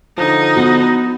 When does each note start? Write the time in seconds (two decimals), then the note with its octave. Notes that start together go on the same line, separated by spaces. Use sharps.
0.18 D3 F3 D#4
0.56 B3 F#4